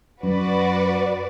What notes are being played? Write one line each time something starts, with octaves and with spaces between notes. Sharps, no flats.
F#2 F#4 B4 D5